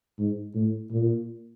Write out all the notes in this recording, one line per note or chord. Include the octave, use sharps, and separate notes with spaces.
G#2
A2
A#2